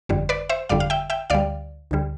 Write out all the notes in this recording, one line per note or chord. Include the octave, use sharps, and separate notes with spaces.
G1 F2 D3 G3
B4 D5
C5 E5
G1 F2 D3 G3 D5 F5
F5
E5 G5
E5 G5
D2 D3 G3 D5 F5
D2 D3 G3